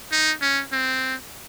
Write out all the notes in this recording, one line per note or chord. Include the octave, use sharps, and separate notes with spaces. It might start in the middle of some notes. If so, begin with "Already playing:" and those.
D#4
C#4
C4